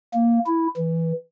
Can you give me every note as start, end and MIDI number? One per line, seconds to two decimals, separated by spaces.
0.14 0.39 58
0.46 0.67 64
0.76 1.12 52